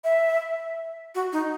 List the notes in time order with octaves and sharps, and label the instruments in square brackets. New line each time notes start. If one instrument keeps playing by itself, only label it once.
[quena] E5
F#4
D#4